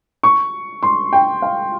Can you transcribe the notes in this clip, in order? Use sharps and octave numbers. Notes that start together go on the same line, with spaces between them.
C#6
C6
G5
F5